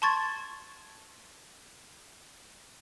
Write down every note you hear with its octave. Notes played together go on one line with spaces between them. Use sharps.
A5 C6 C#6 G#6 A6